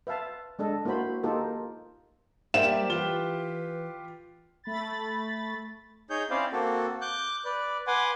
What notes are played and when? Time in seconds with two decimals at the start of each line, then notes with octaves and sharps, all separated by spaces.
0.07 B4 E5 F5 A5
0.59 G#3 D4 A4 D#5
0.85 A#3 E4 F#4 C5 B5
1.23 A#3 D#4 F4 G4 A4 A#4
2.54 G3 A#3 G4 C5 D5 E5 E7
2.90 E3 F4 G4 B4 G7
4.64 A3 B5 A6
6.10 D#4 G#4 C#5 G6
6.30 C4 C#4 E4 C5 D5 F5
6.53 A#3 C4 F#4 A4
7.01 D6 F#6 G6
7.45 B4 D5
7.87 B4 F#5 G#5 C6 D6